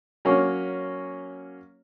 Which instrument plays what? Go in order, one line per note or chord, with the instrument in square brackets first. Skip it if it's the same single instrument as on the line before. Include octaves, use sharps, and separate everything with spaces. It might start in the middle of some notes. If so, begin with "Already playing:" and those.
[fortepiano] F#3 A#3 C#4